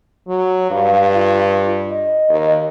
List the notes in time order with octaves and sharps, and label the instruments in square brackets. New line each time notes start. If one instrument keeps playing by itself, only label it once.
[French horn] F#3
[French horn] G2 [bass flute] F5
[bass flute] F4
D#5
[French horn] D#2